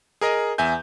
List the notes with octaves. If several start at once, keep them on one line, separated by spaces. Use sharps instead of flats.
G#4 A#4 D#5
E2 E5 G#5 G6